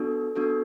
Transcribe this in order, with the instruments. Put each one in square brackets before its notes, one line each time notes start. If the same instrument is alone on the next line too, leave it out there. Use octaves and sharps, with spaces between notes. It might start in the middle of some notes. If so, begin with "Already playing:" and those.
Already playing: [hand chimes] B3 D4 F#4 A4
B3 D4 F#4 A4